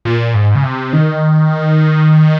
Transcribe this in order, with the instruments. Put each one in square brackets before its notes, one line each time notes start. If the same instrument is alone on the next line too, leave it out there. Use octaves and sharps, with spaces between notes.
[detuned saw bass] A#2
G#2
C#3
C3
D#3